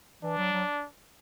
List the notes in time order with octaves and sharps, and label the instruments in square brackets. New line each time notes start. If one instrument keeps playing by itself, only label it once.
[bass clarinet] E3 [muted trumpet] D4
[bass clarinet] F#3
F#3